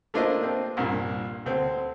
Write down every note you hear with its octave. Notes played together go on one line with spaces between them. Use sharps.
A3 A#3 D4 F4 C5 D#5
C4
C2 G2 A#2
D2 C4